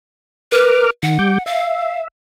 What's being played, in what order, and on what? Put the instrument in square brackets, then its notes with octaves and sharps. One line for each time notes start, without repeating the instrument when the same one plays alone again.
[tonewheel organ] A#4 D6 F6 [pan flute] B4
[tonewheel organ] D#3 [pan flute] F#5
[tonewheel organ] G3 D6 G6
[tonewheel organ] E5 [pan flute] F5